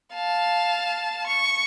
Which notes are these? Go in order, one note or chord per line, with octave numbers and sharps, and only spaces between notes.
F5 A5
C#6